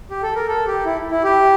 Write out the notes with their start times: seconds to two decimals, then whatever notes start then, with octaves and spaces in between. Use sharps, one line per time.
0.11 G4
0.23 A4
0.35 A#4
0.48 A4
0.67 G4
0.86 E4
1.11 E4
1.24 G4